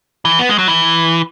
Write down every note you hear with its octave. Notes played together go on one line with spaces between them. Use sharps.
E3
B3
G#3
F#3
E3